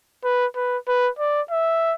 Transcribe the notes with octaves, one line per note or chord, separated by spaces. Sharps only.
B4
B4
B4
D5
E5